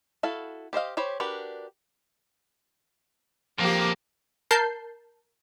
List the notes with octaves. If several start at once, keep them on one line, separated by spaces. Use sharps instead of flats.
E4 F#4 A4 F5
G4 C5 D#5 F5
G4 C5 C#5 B5
D4 F#4 G4 A#4 B4
F2 F3 A#3 G4
A#4 A5 G6 C7